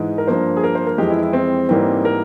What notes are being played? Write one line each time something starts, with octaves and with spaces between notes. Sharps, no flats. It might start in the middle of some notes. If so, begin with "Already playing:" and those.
Already playing: G#2 E3 G#3
A#4
G2 F3 A#3 C5
G#4
A#4
C5
A#4
F2 E3 G#3 G4
E4
E4
C4
G#2 E3 G3 A#3 C4
A#4